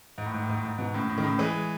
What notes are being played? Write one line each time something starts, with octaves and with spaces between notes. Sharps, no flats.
G#2
A2
G#2
A2
G#2
A2
G#2
G#2 B2
A2 C#3
A2 C#3
D#3
A2 C#3
E3 G#3